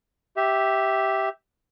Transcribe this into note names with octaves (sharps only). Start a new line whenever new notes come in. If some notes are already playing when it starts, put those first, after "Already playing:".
G4 E5